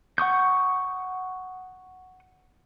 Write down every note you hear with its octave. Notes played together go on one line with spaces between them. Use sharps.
F#5 C#6 D#6 G6